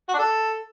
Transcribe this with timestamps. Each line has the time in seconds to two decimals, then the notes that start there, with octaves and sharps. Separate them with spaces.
0.09 F#4
0.14 D4
0.19 A4